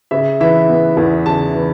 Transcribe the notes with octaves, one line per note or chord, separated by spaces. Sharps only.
C#3 E5
E3 E5
B3
E2
C#3 A5
E3